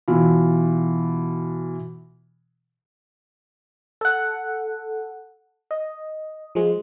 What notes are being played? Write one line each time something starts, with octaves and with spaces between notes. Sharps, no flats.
B2 E3 F4
A4 F#5
D#5
F3 G#3